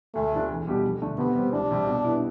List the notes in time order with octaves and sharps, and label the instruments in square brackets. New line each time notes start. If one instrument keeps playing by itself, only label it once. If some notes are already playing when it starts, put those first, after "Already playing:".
[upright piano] D2 [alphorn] A3
[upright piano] C3 F3 B3 D4
E2
B2 G3 D4 G4
F2
D3 A3 D4
[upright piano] C3 [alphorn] B3
[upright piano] G3 C4
[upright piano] C2 [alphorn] D4
[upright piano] C3 G3
B2
B3 E4